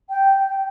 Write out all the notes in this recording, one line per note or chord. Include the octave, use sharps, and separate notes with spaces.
G5